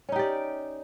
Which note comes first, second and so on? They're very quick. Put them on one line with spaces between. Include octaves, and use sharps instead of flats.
C#4 D#4 G4 D5